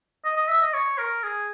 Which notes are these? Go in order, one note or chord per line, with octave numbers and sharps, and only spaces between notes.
D#5
D#5
E5
D#5
C#5
A#4
G#4